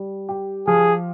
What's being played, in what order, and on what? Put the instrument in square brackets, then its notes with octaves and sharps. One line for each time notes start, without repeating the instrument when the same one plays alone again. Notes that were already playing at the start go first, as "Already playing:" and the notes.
Already playing: [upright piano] G3
G4
[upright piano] F3 [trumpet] G#4